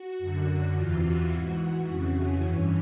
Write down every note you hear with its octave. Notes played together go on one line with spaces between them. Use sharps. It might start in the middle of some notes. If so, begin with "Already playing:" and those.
Already playing: F#4
F#2 D3
E2 C3 E3 F4
F#4
G#2 E3 F#4
F2 C#3 E3 F#4
C#4
G2 E3